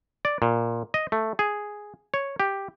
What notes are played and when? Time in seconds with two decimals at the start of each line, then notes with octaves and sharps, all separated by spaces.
0.25 D5
0.42 A#2
0.94 D#5
1.12 A3
1.39 G#4
2.14 C#5
2.40 G4